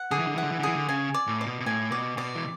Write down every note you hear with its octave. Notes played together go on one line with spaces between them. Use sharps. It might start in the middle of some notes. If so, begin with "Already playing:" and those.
Already playing: F#5
D3 G#4
E3
D3
E3 F#5
D3
E3
D3
E3 G#4
D3
C#3 G#5
D5
A2
D5
B2
B2
A2 G#5
B2 D5
B2 D5
E3